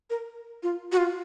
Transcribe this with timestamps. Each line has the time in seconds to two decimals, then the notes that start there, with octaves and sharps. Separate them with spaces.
0.10 A#4
0.63 F4
0.92 F#4
0.97 F4